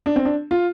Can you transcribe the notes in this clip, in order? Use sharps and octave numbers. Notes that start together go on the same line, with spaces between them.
D4
C4
D4
F4